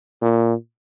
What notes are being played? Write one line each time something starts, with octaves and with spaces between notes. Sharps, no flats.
A#2